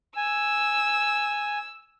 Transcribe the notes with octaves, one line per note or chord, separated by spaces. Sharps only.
G#5 E6